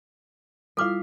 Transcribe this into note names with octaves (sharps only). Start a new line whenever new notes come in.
G3 E4 F4 A4 F5 D6 F6 B6